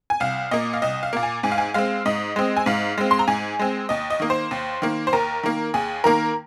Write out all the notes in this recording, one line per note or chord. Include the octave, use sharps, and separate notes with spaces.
G#5
C2 F5
A#2 A#3 D#5
F5
C2 D#5
F5
A#2 A#3
G#5
G#2 G#5
F5
G#5
G#3 C4 F5
G#2 D#5
G#3 C4
G#5
G#2 F5
G#3 C4
C6
A#5
G#2 G#5
G#3 C4
D#2 D#5
D#5
D#3 A#3
C5
D#2
D#3 A#3
C5
D#2 A#4
D#3 A#3
D#2 G#4
D#3 A#3 A#4